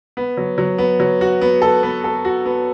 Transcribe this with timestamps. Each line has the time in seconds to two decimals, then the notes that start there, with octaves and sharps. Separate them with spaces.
0.17 B3
0.37 F#3
0.58 F#3
0.78 B3
1.00 F#3
1.21 F#4
1.41 B3
1.62 A4
1.83 B3
2.04 A4
2.25 F#4
2.46 B3